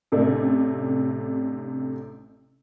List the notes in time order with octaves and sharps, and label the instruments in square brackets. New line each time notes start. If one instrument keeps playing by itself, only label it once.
[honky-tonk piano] A1 C3 A3 D4